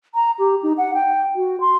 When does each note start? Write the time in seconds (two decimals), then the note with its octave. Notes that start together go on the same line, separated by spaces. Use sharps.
0.15 A#5
0.39 G4
0.63 D#4
0.78 F#5
0.94 G5
1.36 F#4
1.60 C6